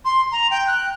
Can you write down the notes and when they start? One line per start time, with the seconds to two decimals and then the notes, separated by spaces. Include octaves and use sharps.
0.05 C6
0.32 A#5
0.51 G5
0.67 F#6